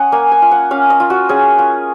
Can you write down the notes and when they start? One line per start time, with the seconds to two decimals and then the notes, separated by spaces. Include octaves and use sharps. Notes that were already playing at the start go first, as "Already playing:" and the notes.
Already playing: C#4 D#5 F#5
0.12 A#3 G#5
0.32 G#5
0.42 F4
0.51 F#5
0.71 C#4 F5
0.90 D#5
1.00 F4
1.10 F#4
1.29 C#4 G#4
1.58 F4